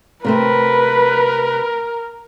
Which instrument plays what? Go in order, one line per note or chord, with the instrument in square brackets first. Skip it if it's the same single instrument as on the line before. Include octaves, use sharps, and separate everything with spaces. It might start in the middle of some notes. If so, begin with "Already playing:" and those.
[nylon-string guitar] C3 A3 C4 [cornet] A#4 [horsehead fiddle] B4